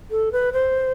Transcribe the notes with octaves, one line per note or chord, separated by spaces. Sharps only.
A4
B4
C5